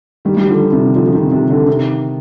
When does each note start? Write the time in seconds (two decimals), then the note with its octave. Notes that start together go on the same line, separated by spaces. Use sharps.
0.25 D#3 G3
0.37 G3
0.49 D3 F3
0.72 C3 D#3
0.96 D3 F3
1.06 F3
1.14 C3 D#3
1.31 C3
1.50 D3
1.67 C3 D#3